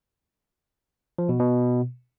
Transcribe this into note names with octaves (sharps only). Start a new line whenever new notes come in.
F3
B2
B2